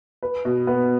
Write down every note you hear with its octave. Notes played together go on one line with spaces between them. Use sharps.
B4
B2
B3